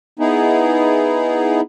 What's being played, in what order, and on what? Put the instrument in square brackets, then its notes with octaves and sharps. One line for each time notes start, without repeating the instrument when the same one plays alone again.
[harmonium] B3 D#4 E4 G#4